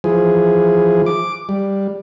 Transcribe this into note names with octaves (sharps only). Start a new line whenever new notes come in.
E3 F3 G#4
D6
G3